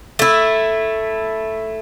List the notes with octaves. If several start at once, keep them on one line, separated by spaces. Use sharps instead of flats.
A3 E4